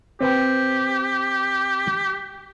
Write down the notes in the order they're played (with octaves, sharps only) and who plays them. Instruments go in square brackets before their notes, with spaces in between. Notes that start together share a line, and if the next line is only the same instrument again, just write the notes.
[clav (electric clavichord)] C4 B4 G5 [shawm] G4